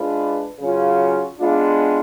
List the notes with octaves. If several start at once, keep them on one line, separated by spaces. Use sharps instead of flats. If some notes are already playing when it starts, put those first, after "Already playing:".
Already playing: G#3 D4 F4 B4
C#3 F#3 C#4 F4
G#3 B3 D4 F4